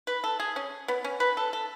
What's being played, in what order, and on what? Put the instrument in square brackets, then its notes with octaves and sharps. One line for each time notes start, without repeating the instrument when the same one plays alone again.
[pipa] B4
A4
G#4
C#4
B3
C#4
B4
A4
A4